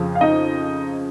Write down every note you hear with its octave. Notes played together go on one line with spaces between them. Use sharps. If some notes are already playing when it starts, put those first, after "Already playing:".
Already playing: F2 C#3 F3
F5
D#4 D#5